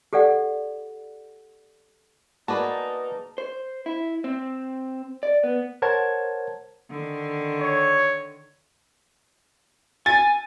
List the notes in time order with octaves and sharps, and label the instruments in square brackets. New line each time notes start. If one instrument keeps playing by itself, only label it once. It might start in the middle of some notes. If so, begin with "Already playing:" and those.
[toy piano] G4 A4 D5 F#5
[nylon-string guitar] A#3 G#4 B4 [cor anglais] D#4 [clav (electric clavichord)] F#4 D5 [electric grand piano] A5
[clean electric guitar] C5
E4
C4
D5
B3
[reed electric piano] A#4 C5 C#5 F#5 A5 G#6
[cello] D3 D#3
[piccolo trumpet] C#5
[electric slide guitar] G#5 [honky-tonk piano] A6